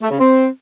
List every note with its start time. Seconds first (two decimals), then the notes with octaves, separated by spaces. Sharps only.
0.01 A3
0.10 C#3
0.19 C4